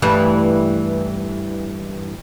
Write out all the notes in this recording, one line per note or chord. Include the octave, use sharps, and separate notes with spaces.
G2 E3 A3